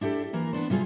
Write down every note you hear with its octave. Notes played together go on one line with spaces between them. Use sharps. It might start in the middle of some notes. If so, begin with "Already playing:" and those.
D4 E4 G4 A4
E3 A#3 A#4
B3 D4 C5
C3 G3 F4 G#4